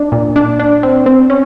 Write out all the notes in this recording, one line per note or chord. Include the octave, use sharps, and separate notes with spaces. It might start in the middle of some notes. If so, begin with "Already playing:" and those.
Already playing: D4
A#2
D4
D4
C4
C4
C#4